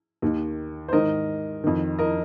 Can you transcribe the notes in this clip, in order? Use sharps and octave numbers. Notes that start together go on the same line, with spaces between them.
D#2 D#3
C5
G#2 D#3 A#4 D#5
F2 D#3
A#4 D#5